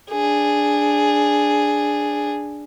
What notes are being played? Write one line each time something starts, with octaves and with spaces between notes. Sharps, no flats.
D4 G#4